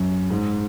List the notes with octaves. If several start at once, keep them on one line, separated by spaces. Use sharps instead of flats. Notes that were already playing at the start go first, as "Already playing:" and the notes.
Already playing: F#2
G#2